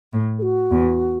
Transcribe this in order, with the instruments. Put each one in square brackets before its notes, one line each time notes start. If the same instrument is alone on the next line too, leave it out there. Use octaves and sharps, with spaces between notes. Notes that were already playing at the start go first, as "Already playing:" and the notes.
[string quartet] A2
[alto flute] A4
F#4
[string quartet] E2